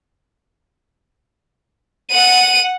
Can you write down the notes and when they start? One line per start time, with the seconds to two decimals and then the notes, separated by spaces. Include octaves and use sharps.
2.12 F#5 D#7